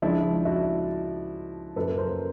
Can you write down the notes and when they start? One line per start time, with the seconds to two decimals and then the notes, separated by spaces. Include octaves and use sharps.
0.02 C#2 C#3 F3 G#3 D4 E4
0.45 E4 F#4
1.76 F#2 C#3 F#3 A#3 A4 B4
1.98 A#4 C5